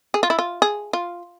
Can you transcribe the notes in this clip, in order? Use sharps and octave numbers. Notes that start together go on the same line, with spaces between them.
G#4
F4
E4
F4
G#4
F4